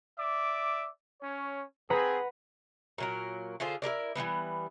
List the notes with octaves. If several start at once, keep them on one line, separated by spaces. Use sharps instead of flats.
D5 E5 D6
C#4 C#5
C4 G#4 B4 F#5 A#5
A#2 F#3 A#4
D3 F4 G#4 C5
E4 G#4 A#4 D5
E3 F#3 G3 B3